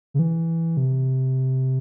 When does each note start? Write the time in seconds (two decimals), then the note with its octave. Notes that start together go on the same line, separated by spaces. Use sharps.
0.14 C#3
0.19 E3
0.77 C3